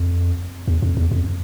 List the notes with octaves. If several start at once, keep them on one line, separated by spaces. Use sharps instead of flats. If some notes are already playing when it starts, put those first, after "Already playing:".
Already playing: F2
E2
F2
E2
F2